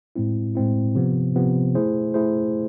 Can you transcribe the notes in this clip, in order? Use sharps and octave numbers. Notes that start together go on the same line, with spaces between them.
A2 G#3 C4 E4
A2 G#3 C4 E4
C3 F3 B3
C3 F3 B3
A3 E4 G#4 C5
A3 E4 G#4 C5